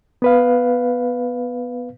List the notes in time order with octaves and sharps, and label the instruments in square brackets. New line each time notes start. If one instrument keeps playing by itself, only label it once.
[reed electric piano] B3 B4 F5